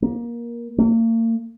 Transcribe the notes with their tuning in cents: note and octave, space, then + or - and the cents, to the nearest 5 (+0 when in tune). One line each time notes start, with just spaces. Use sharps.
A#3 +20
A#3 -40